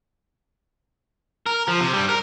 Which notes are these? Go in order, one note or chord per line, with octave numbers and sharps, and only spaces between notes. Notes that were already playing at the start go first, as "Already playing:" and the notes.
A#4
F3
C3
G2 G3
A#4